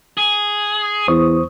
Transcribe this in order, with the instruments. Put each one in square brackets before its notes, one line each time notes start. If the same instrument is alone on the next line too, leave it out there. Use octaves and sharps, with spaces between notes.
[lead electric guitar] G#4
[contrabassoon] E2 [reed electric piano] C5 C#6 D#6